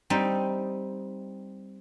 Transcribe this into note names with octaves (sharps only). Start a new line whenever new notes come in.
G3 C4 D#4